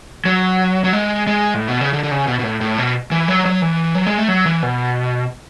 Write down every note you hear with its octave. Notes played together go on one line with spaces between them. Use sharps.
F#3
F#3
G#3
G#3
A2
B2
C#3
D3
D3
C#3
B2
B2
A2
A2
B2
E3
F#3
F#3
E3
F#3
G#3
A3
F#3
E3
B2